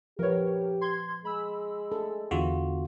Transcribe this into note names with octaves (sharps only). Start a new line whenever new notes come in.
F3 G4 A#4 B4 C#5
C6 G#6
G#3 B5 E6
A4
E2 D3 F4 F#4